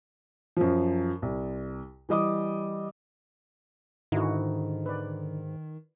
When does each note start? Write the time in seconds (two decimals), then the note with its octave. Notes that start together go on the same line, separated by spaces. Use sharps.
0.57 F#2 F3
1.22 C2
2.09 E3 G3 D#5 D6 D#6
4.12 G#2 D3 D#3 D#4 E4 F#4
4.86 B4 D5